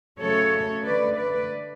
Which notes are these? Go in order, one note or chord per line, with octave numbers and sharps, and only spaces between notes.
C#3 F#3 A3 A4 C#5
D3 A3 B4 D5
B4 D5